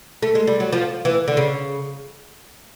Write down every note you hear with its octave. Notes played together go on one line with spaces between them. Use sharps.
A3
G#3
G3
F#3
F3
E3
D3
C#3